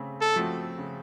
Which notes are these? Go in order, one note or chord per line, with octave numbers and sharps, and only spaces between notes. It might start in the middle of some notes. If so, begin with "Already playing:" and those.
Already playing: C#3 A3 C4
A4
F3 A3 C4 F#4
C#3